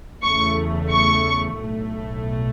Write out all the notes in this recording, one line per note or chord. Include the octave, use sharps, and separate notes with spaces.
E2 C#3 A3 C#6
C#6
B1 A2 A3